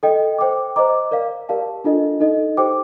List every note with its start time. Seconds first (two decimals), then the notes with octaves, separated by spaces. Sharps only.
0.03 A4 D#5 G5
0.38 C5 G5 D6
0.76 C5 D#5 A#5 D6
1.11 A#4 D5 F5
1.49 G4 A#4 D5 F5 A5
1.84 D4 F4 A4 D#5
2.20 D#4 A4 D#5
2.57 G4 C5 G5 D6